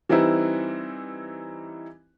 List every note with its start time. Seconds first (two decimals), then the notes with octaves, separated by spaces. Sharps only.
0.09 E3 G3 C4 D#4 E4 B4